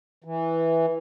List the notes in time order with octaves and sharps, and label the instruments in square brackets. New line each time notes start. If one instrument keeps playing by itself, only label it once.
[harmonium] E3